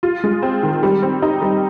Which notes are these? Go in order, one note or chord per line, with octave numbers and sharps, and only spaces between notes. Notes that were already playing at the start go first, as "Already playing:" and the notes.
F4
G#3
C4
D#3
G3
C4
D#4
G3